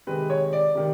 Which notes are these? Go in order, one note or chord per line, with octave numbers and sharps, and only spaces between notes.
C3 D#3 G#3 B4
C#5
D5
C3 D#3